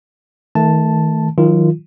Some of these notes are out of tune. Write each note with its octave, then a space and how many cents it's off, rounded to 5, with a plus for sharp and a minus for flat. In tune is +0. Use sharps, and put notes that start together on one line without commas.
D#3 +30 A3 +0 A5 +0
D#3 +15 F#3 -25 F4 -20